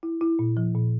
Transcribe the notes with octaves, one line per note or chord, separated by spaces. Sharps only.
E4
E4
A#2
F3
A#2